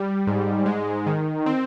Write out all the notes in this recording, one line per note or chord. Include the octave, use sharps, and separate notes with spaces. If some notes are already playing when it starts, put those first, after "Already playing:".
Already playing: G3
G#2
G#3
D#3
C4